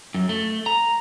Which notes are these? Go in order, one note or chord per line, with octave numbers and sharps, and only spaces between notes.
F#2
A3
A#5